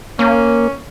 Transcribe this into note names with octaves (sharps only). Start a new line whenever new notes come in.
A#3 C#4